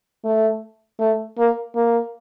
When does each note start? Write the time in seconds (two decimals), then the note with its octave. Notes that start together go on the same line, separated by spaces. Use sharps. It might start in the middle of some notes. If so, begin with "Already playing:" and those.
0.25 A3
1.00 A3
1.38 A#3
1.75 A#3